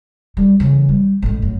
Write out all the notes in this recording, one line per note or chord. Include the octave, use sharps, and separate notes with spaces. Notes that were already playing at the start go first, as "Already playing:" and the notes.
G3
C#3 E3
G3
A1 G#2
F#2